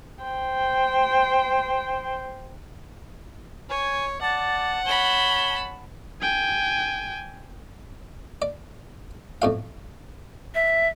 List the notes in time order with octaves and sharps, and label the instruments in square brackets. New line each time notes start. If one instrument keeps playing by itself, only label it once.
[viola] C5 G5
[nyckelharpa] C#5 [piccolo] G#5
[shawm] D5 [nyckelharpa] F#5 [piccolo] A5
[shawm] C#5 [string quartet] A5 B5 [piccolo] G7
[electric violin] G5 G#5
[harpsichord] D5
F2 A2 F5
[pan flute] E5